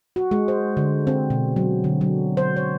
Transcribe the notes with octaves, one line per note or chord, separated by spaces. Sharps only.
F#4
G#3
C5
D3
C4
B2
F#3
D3
F#3
C5
C#5